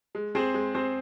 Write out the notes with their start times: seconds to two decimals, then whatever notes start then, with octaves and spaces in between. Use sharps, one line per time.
0.15 G#3
0.35 C4 G#4 C5
0.54 G#3
0.74 C4 G#4 C5